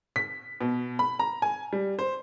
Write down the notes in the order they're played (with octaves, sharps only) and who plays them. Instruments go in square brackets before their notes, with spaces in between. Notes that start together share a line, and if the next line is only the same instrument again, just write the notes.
[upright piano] B6
B2
B5
A#5
G#5
G3
C5